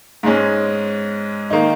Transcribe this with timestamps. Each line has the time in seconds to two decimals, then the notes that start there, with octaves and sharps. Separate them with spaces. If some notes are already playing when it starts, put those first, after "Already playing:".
0.23 G#2 G#3 C#4
1.50 D#3 A#3 D#4